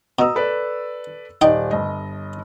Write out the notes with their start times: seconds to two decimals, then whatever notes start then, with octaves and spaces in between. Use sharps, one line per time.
0.19 B2 A#5 D#6 E6
0.35 A4 B4 D5
1.41 D#1 D#4 D5 G5
1.71 G1 D#5